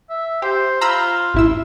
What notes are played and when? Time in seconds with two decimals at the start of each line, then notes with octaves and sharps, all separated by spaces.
0.10 E5
0.42 G4 C5
0.81 F4 A#5 B5 E6
1.34 A1 E4 E6